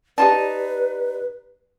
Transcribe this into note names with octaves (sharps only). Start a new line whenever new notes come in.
D#4 F4 G4 B4 D5 A5